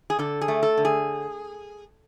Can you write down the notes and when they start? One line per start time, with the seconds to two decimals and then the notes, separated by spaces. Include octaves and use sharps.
0.10 G#4
0.19 D3 A4
0.41 G#4
0.48 A3
0.63 A4
0.77 D3
0.85 G#4